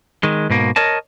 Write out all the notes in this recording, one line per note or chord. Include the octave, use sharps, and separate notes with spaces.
D#3 G#3
G#2 B2 A#3
A#4 C#5 D#5 A5